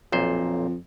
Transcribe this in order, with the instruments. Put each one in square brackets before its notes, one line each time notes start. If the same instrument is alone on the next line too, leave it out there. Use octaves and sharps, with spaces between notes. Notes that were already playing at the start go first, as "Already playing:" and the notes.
[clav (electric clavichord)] B1 A#2 C5 [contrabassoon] F2